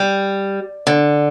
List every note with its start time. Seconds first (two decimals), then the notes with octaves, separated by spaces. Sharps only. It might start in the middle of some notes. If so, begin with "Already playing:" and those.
Already playing: G3
0.87 D3